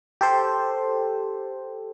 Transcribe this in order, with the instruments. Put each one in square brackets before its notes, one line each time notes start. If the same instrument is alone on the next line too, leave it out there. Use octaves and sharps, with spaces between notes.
[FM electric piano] G4 A4 C5